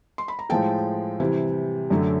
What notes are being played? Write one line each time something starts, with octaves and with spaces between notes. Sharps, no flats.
C6
B5
A#5
A2 F3 G#3 G5 A5
C3 E3 G3
F#2 D3 F#3 A3